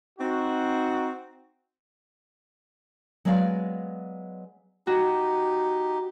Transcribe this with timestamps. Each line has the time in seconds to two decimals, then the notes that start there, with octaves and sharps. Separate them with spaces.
0.19 C4 D#4 F#4
3.25 F#3 G#3 B3 D5 F5
4.87 D#4 F#4 G4